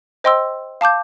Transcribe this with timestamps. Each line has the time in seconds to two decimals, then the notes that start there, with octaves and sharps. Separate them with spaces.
0.24 C5 D#5 G5 C6 E6
0.81 F5 A5 D6 G6